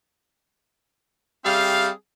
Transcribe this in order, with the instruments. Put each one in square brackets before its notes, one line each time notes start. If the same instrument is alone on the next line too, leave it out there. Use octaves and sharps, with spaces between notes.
[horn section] G3 C4 G#4 E5 F5